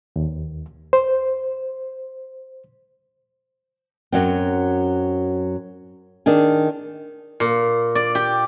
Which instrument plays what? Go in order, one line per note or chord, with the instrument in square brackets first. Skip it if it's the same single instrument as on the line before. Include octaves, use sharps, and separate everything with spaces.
[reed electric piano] D#2
C5
[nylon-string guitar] F#2 F#3 C4
D#3 D4 G#4
[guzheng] A#2
D5
G4